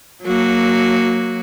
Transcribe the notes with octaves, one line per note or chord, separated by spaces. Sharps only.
F#3 A#3 F#4